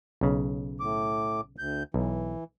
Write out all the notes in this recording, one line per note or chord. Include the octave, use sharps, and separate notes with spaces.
B1 C#3
A2 D6
D2 G6
B1 E3